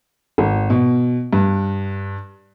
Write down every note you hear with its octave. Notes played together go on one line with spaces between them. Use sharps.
G#1
B2
G2